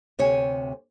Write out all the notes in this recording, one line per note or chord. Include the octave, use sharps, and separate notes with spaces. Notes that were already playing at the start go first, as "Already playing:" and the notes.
D2 C3 C#5 G#5